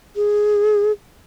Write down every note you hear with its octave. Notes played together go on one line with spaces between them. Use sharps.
G#4